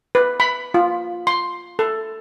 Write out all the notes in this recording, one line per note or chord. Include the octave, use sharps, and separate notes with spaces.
B4
B5
F4
C6
A4